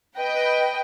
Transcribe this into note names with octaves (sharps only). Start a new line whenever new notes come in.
B4 D#5 G5